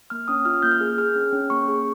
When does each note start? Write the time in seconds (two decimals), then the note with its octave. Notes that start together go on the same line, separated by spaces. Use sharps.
0.10 A#3 F6
0.28 C#4 D#6
0.45 F4 F6
0.63 A#3 G6
0.71 F6
0.80 G#4
0.98 G#4 F6
1.16 C#4
1.33 C#4
1.50 A#3 C#6
1.68 G#4